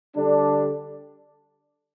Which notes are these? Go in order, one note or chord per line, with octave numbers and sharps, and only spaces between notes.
D3 G3 D4